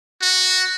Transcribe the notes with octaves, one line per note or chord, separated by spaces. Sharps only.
F#4